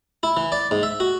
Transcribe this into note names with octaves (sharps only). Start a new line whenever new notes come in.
E4
E3
D5
G#2
E5
F#4